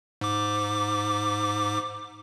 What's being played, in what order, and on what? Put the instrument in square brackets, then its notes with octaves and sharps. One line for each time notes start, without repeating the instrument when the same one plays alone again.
[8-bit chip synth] G#2 D6